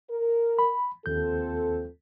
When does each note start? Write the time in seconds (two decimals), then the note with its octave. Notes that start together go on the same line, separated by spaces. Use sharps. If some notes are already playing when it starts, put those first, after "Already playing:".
0.10 A#4
0.59 B5
1.06 D#2 F3 C4 A4 G6